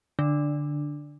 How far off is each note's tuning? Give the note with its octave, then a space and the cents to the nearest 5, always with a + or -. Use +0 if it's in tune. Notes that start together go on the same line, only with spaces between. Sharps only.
D3 +0 D4 +5